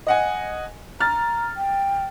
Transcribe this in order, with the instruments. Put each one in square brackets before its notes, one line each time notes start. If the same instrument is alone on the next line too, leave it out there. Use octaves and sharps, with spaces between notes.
[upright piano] D#5 F#5 G#5
[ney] A#5 [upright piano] F6 A6
[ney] G5